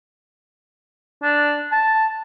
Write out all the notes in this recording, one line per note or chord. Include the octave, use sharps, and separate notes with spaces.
D4
A5